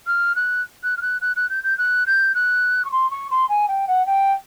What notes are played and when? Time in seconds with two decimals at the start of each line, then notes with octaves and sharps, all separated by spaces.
0.07 F6
0.36 F#6
0.83 F#6
0.97 F6
1.02 F#6
1.21 F#6
1.36 F#6
1.49 G6
1.63 G6
1.78 F#6
2.06 G6
2.34 F#6
2.85 C#6
2.92 C6
3.11 C#6
3.31 C6
3.49 G#5
3.68 G5
3.88 F#5
4.06 G5